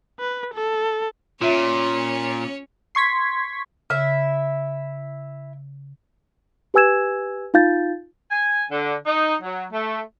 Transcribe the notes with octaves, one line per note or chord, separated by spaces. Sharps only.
B4
A4
A#2 C#4 F4 C#5 E5 A#5
C6 C#6 G#6 B6
C#3 E4 E5
G4 B4 G#5 E6 G#6 E7
D#4 F4 F5 G6 A6
G#5
D3
D#4
F#3
A3